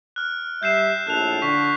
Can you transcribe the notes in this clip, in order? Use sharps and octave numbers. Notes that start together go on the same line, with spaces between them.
F6 F#6
G3 E5 G6 C7 E7
A#1 A2 A4 F#6 F7
D3 C#6 B6